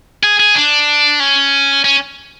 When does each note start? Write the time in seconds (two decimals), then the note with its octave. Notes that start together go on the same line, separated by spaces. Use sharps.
0.23 G#4
0.40 G#4
0.55 D4
1.20 C#4
1.84 C#4